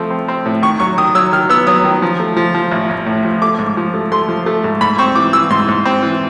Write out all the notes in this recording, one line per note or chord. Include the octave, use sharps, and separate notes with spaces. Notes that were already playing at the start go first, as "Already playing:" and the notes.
Already playing: F3 A3 C4
C4
C4
A2
D#3 C#6
F#3 C#6
D#3 D#6
F#3 E6
D#3 F6
B3 E6
F#3 D#6
D#3
F3
A3
F3
F3
A1
A1
A2
F3
A3 D6
G#2
F3
A3
A3 C6
F3
A3
G#2
G#2 B5
C4 C#6
E3 D6
E3 E6
G#2 C6
G#2
C4
E3